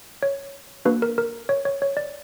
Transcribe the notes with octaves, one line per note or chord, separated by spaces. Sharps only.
C#5
A#3 D4 F#4 B4
A#4
A#4
C#5
C#5
C#5
D5